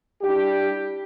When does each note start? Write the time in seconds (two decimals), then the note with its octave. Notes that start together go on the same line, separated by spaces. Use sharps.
0.22 G3 D4 E4 G4